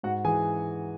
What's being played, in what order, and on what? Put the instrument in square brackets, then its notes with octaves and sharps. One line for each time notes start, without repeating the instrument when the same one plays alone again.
[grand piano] G#2 F#4 F#5
E3 G#4 G#5